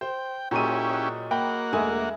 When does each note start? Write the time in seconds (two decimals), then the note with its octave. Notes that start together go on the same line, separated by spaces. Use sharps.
0.01 C5 G5
0.51 A#2 F#3 G#3 C#4 E4 G4 D#7
0.90 D#5 F#5
1.31 A#3 F#5 G5 B5
1.73 E1 G#3 A3 E5 G#5